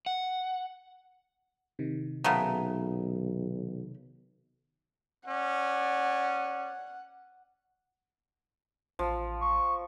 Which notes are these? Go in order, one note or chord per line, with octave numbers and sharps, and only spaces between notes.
F#5
C3 D#3
B1 C#3 A3 B3 A#4
C#4 D5 F#5
A1 F3
C#6